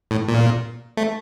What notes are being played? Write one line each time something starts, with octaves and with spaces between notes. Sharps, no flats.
A2
A#2
A3